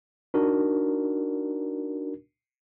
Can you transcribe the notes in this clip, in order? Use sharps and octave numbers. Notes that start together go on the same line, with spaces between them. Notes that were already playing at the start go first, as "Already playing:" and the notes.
D4 D#4 F#4 A#4